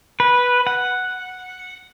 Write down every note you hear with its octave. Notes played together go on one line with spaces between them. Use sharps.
B4
F#5